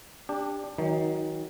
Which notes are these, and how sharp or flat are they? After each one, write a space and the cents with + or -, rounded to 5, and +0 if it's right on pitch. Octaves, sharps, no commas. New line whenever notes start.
D4 +0 G4 +20
D#3 +40 F#3 +15 D#4 +10